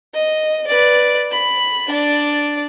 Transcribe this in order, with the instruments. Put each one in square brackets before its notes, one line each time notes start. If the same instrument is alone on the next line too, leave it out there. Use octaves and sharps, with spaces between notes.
[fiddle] D#5
B4 D5
B5
D4 D5